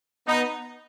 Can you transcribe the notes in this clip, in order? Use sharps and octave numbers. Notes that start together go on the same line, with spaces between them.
B3 D#4